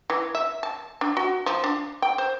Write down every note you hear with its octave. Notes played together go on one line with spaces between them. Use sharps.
E3
E5
A5
D4
F#4
F3
D4
G5
C5